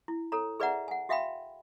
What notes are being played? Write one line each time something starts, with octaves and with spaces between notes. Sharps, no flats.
E4
A4 C#5 A#5
G#4 B4 D5 E5 F#5 A#5
F#5 G#5
F#4 E5 F5 G5 B5